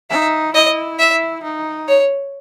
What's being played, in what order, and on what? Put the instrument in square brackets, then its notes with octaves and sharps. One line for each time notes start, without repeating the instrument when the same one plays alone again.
[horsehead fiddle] D#4 [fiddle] E5
[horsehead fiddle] E4 [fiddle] D#5
[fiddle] E5
[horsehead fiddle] D#4
[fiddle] C#5